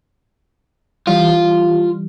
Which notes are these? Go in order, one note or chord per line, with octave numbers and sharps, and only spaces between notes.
E3 G3 F4